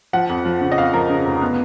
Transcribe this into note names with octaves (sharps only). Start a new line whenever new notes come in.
F3 F#5
F2
F3
C#3
D#5
F2 F5
F3 A#4
C#3
F1
B3